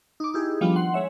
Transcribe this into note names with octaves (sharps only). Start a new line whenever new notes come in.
D#4 D6
D#4 E4 G4 G#4
D#3 F3 G3 B3 D4 F4
F#5 C6
G#3 C#5 E5